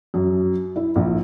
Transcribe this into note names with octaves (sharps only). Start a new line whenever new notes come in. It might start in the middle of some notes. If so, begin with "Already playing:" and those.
F#2
E4
A#1